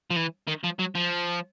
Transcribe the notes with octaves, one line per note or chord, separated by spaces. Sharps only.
F3
E3
D#3
F3
F#3
F3